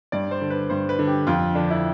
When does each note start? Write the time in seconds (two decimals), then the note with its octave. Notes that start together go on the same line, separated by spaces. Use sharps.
0.12 G2 D5
0.31 C5
0.41 D3
0.50 B4
0.70 G2 C5
0.89 B4
0.99 D3
1.07 G4
1.27 F2 F4
1.55 D3 D4
1.70 E4